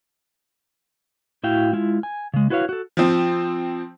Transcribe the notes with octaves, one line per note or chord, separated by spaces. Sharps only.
A2 E4 F#4 F5 G5
G#3 E4 F4
G#5
C#3 G#3
E4 F#4 B4 C#5 F5
F#4 A4
F3 C4